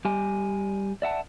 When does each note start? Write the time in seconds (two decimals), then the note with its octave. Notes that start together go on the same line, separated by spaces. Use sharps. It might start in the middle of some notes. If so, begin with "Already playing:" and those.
0.05 G3 G4 G#5
1.02 D5 E5 F#5 A5